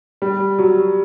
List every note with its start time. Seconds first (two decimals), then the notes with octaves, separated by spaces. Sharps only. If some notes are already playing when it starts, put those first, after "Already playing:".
0.22 G3
0.59 F#3